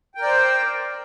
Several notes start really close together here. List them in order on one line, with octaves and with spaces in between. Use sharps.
G5 A#4 D5 C5